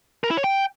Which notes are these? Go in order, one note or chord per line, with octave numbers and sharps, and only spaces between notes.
A#4
E4
C#5
G5